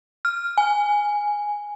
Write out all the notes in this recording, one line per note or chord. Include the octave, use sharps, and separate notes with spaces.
F6
G#5